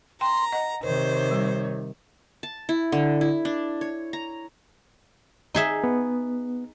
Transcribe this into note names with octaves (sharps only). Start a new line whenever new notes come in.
G5 A#5 C6
D#5 F#5
C3 D#3 C5 C#5
G3
A5
E4
D3
E4
D4
C#5
A#5
D#4 G#4 E5
B3